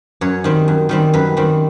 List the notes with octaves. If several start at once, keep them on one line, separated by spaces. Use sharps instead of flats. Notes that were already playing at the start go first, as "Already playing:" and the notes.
F#2 C#5
D#3 G3 C4
F#2
D#3 G3 C4
F#2 B4
D#3 G3 C4